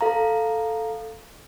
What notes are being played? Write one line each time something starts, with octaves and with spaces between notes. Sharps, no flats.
A4 F5 A#5